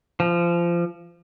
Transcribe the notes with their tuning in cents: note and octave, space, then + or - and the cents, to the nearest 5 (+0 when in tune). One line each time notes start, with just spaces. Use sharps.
F3 -25